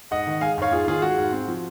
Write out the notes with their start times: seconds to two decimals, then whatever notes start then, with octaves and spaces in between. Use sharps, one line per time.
0.11 G#2 D#5 F#5
0.27 D#3
0.41 G#3 F5 G#5
0.58 G#2 C#5 F5
0.72 G#2 F4 G#4
0.88 D#3 F4 G#4
1.02 G#3 F#4
1.18 G#2
1.33 C4
1.48 F3